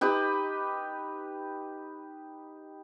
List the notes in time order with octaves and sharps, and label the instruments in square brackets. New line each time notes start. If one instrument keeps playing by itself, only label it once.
[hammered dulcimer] D#4 G4 B4